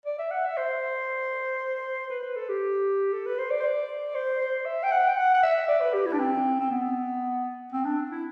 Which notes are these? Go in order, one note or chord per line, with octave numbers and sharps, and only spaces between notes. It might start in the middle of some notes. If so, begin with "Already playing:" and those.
D5
E5
F#5
E5
C5
B4
B4
A4
G4
A4
B4
C5
D5
C5
D5
C5
C5
E5
G5
F#5
G5
F#5
F#5
E5
D5
B4
G4
E4
D4
C4
C4
B3
C4
D4
E4